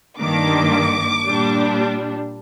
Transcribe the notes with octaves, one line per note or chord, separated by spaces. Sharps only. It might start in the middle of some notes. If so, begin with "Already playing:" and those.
G2 D#3 A#3 D4 D6
A#2 G3 D4